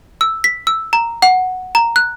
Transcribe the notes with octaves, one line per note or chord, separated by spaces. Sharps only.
E6
B6
E6
A#5
F#5
A#5
F#6